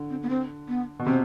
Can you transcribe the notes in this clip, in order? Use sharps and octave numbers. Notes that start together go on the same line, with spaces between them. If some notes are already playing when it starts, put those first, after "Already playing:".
Already playing: D3
C4
B3
C4
B3
B2
C3 C4